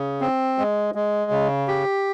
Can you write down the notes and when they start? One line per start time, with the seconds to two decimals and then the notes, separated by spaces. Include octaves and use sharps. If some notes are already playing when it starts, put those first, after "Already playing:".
Already playing: C#3
0.21 C4
0.58 G#3
0.95 G#3
1.31 C#3
1.68 G4